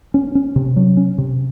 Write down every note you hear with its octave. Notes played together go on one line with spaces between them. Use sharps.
C#4
C#4
C3
F#3
C#4
C3